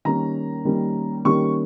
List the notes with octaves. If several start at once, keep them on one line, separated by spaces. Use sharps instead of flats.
D#3 G3 A#3 C#4 A#5
D#3 G3 A#3 C#4
D#3 G3 A#3 C#4 C#6